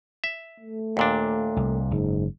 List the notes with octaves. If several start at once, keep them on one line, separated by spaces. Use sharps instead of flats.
E5
A3
D#2 A#2 D4
C2
F#1 G#2